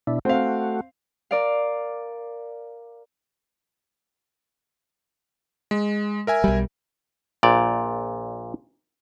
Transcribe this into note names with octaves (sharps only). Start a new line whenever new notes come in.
B2 D4 E4
A3 C4 F#4 F5
A#4 D5 F5
G#3
A#4 E5 G#5
B1 G3
A#1 A#2 D5